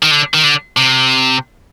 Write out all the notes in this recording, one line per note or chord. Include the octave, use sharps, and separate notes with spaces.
D#3
D3
D#3
D3
C3